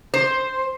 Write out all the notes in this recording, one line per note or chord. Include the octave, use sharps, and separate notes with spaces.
C5